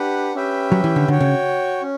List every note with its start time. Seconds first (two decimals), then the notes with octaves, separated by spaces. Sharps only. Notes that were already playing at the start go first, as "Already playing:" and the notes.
Already playing: D4 G4 B4 F#5
0.35 C#4 G4 B4 E5 G5
0.72 F#3
0.84 E3
0.96 D3
1.08 D3 F#4 C#5 G5
1.20 C#3
1.82 C#4